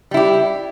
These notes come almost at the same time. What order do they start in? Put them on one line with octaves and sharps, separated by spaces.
G3 E4 G4